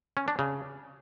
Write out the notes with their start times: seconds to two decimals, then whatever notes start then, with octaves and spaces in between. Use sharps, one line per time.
0.17 C#4
0.28 D4
0.39 C#3